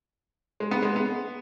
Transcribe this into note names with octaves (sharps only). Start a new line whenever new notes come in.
G#3
B3
G#3
B3